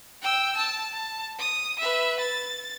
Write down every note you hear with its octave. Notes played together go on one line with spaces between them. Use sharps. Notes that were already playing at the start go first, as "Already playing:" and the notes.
G5 E6
A5
A5
D#6
B4 E5
A6